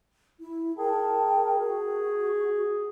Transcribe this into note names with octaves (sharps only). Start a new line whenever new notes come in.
E4
G#4 A#4 G5 A5
F#4